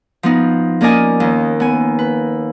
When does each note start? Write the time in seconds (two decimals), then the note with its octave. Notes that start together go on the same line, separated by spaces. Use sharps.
0.23 F3 B3 D#4
0.81 A#3 C#4 A#4 D5 D#5 G#5
1.20 D#2
1.60 B3 G#5
1.99 B4